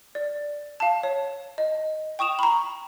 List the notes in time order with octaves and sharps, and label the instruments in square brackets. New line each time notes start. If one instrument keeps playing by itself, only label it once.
[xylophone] D5
F5 A5
C#5
D#5
G5 C#6 D#6 E7 F7
A#5 B5